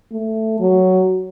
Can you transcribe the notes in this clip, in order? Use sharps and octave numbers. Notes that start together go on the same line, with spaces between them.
A3
F#3